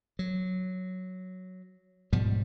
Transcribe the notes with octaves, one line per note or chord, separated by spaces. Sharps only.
F#3
G#2 B2 F3 G3